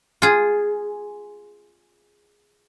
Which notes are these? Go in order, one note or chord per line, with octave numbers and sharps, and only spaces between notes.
F4 G#4